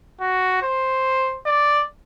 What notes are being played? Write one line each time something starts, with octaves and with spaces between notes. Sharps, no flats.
F#4
C5
D5